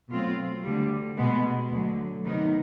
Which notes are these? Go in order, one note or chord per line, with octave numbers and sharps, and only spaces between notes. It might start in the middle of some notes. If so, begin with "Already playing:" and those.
B2 F#3 A3 C4 F4
D2 D3 G3
B2 G#3 B3
D2 D3 F#3
C3 D#3 F#3 B3 D#4